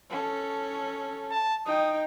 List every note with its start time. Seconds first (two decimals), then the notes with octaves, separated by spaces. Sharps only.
0.10 C#4 A4
1.30 A5
1.66 D#4 G5 D#6